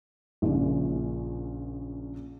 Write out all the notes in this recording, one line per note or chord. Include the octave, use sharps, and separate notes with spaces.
A#1 A#2 C#3